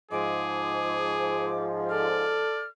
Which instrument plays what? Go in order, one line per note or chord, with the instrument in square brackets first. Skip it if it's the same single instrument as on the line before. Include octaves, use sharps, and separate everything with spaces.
[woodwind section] G#2 F3 [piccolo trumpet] G#4 [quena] D6
[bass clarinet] A4 [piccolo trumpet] D5 [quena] F6